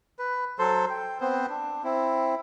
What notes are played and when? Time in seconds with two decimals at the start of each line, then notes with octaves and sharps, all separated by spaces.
0.19 B4
0.59 F#3 A4 C5 C6
0.90 G5
1.21 B3 C4 C5
1.50 D4
1.84 C4 E4